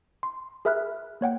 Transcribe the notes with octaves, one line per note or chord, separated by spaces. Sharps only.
C6
G#4 A#4 E5 B5 F6 F#6
A#3 C#5 F#5 G5